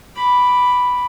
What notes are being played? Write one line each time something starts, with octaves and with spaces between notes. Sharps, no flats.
B5 D6